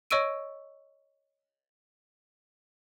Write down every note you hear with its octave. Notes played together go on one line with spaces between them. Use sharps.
C#5 D#5 C#6 E6 D7 D#7